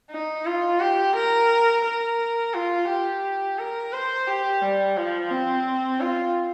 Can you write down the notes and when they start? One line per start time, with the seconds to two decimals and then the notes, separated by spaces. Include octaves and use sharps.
0.11 D#4
0.46 F4
0.80 G4
1.15 A#4
1.85 A#4
2.54 F4
2.89 G4
3.58 A#4
3.93 C5
4.27 G4
4.61 G3
4.97 F3
5.31 C4
6.01 F4